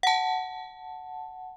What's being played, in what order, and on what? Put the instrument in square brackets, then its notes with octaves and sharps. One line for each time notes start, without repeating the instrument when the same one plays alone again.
[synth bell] F#5 A5